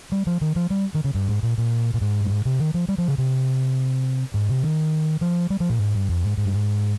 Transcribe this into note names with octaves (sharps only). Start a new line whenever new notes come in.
G3
F3
D#3
F3
G3
D#3
C#3
G2
G#2
A#2
A#2
A#2
G#2
G2
G#2
C3
D#3
F3
G3
F3
C#3
C3
G#2
C3
D#3
F3
G3
F3
A#2
G#2
G2
F2
G#2
G#2
G2
G#2